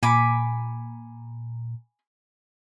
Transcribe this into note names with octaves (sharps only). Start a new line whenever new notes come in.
A#2 G#5 B5 D6